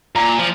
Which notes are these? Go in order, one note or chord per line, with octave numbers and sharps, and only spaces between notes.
A#2 A#5
F3